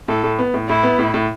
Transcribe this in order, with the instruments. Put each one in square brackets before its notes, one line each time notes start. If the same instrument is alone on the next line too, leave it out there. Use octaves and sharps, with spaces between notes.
[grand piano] A2 [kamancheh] A4
[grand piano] A2
B3
A2
[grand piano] A2 [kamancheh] E4
[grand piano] B3
A2
A2